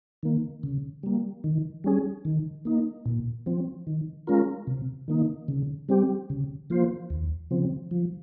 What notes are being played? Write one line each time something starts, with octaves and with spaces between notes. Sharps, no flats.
D#3 A#3
C#3
G3 A#3
D#3
G3 C#4 G#4
D#3
A#3 D#4
A#2
F3 C4
D#3
G#3 C#4 F4 A#4
C3
D#3 A#3 D#4
C#3
G3 C4 G4
C#3
F3 A#3 F4 C5
D#2
C#3 F3 C4
F3